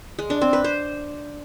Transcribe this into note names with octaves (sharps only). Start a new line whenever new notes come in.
G#3
D4
C4
B4
C5